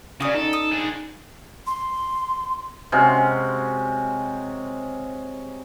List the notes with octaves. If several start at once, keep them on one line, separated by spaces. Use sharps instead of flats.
C#3 C#4 F#4 D5 D#6
D#4 A4
D#6
D4 G#4
C6
C3 G#3 C#4 F#4